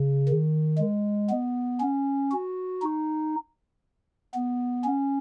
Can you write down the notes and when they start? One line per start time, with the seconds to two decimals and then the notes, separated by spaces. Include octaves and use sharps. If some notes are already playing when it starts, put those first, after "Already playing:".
Already playing: C#3
0.28 D#3
0.78 G#3
1.29 B3
1.80 C#4
2.32 F#4
2.82 D#4
4.34 B3
4.85 C#4